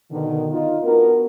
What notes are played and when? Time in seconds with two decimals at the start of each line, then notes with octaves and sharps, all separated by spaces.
0.11 B2 D3 D#3
0.51 D#4 F4
0.83 B3 D4 F#4 A#4